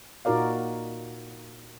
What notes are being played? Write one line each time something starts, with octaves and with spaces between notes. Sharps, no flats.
A#2 D#4 F#4 A#4 D5 F5